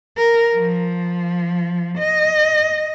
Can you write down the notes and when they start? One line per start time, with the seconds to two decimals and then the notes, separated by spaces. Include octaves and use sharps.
0.17 A#4
0.55 F3
1.98 D#5